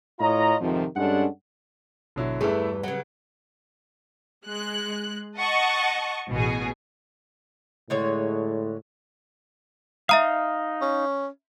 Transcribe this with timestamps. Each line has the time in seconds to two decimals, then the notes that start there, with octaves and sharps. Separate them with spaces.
0.20 A2 F4 C#5 D#5 A#5
0.61 F2 G#2 C3 D#3 F3
0.96 G2 G#3 C#4 D4 A4 F#5
2.16 G#1 B2 D3 F#3 E4
2.41 E2 G2 E3 A3 E4 G#4 B4
2.83 C#3 F#3 F#5
4.45 G#3 F#6
5.37 D#5 F#5 A5 C#6
6.31 A1 B2 G#4
7.90 A2 D3 G#3 C#5
10.09 D#4 E5 F5 A#5 D#6
10.81 C#4